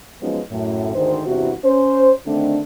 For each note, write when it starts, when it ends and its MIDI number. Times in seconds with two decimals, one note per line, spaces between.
0.22 0.40 53
0.22 0.40 54
0.22 0.40 56
0.22 0.40 59
0.22 0.40 61
0.22 0.40 63
0.51 0.91 42
0.51 0.91 45
0.95 1.21 38
0.95 1.21 44
0.95 1.21 51
0.95 1.21 72
1.26 1.53 40
1.26 1.53 43
1.26 1.53 48
1.26 1.53 64
1.26 1.53 66
1.65 2.12 61
1.65 2.12 72
2.26 2.60 50
2.26 2.60 51
2.26 2.60 57
2.26 2.60 60
2.26 2.60 62